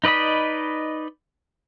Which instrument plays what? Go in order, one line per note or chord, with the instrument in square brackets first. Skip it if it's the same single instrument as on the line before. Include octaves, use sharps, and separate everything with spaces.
[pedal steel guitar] D#4 B4 D5 D#5 B5